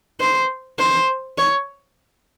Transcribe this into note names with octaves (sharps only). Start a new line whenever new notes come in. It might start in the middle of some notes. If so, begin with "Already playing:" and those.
C5
C5
C#5